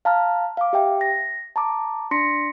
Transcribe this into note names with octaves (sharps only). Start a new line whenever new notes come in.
F5 A5 A#5 F6
F5 D6
G4 E5 G5
A#6
A5 A#5 D6
D4 C6 A#6 B6 C#7